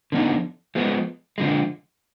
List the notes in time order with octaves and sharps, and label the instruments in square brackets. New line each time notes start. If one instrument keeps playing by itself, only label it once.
[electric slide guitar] D3 F3 B3 D#4
F3 G#3 B3
D3 F3 G#3